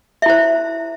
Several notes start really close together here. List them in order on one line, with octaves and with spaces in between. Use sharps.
E5 E4 C5